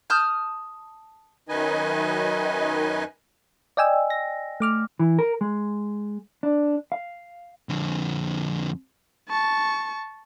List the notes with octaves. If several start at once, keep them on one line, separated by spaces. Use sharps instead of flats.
A5 D#6 F6 G6
F#2 D#3 D#4 B4 D#5 G#5
D5 D#5 G5 G#5 E6
A#6
A3 D6 F6
E3
A#4
G#3
D4
F5
F2 D3
A5 C#6